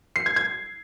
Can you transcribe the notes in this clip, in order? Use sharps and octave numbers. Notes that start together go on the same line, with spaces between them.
C7
G#6
G#6